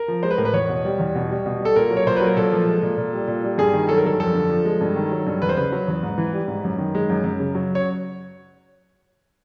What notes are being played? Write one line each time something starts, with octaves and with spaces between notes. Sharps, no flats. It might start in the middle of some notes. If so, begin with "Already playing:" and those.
Already playing: A#4
F3
G#3 C5
B4
A2 A#4
B4
E2 C#5
B2
G3
E2
B2
G3
B2
G3 A4
A#2 A#4
F#3
C#5
A#2 C5
F#3 B4
A#4
A#2 A4
F3
G#3
A#2
A#2
G3
A#2
G3
G2 G#4
D#3
F#3 A4
A#4
G2 A4
F2 A4
D3
F3
G#3
G2
D#3
F#3
G2
E2 B4
C5
C#3 B4
F#3
E2
G#2
E3
G3
G#2
F#2
D#3
G#3
F#2
F#2
C#3
F#3
C#5